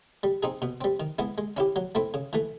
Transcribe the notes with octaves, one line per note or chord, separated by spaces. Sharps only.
G3
C4 D#4 G#4
B2
G3 C4
D#3
G#3 B3 E4
G#3
C#4 E4 G4
F#3
A3 C4 E4
C#3
E3 A3